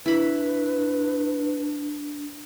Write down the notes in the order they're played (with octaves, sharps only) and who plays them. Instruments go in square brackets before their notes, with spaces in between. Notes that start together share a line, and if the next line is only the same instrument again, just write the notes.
[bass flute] D4 [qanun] E4 B5 [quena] B4